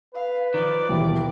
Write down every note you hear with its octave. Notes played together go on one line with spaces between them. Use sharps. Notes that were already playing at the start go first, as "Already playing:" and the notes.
B4 F5
D#3 F3 D5 D6
D#1 B2 E3 G4